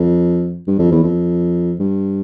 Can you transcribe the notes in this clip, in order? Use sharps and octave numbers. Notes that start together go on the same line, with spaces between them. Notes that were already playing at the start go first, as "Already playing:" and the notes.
Already playing: F2
G2
F2
E2
F2
G2